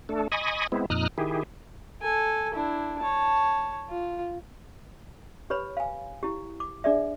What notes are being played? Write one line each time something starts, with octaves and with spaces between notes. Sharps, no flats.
A3 D4 A4
D#5 G#5 B5 C#6 D#6
G#3 B3 C4 E4
F2 A#2 D#4 D#6 F6 F#6
D#3 E4 G4 G#4
A4 G#5
D4 E4
C#5 A5
F4
G4 B4 C#5 B5
F5 G#5
E4 G4
D6
D4 G#4 D5 E5